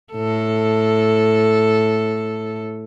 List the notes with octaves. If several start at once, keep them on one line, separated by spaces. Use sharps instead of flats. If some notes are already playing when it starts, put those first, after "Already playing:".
A2 A4